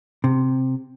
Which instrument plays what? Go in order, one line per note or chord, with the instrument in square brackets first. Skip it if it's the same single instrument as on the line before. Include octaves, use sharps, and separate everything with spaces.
[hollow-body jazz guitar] C3